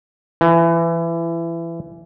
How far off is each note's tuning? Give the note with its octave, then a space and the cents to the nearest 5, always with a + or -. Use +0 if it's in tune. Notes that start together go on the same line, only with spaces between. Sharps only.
E3 +25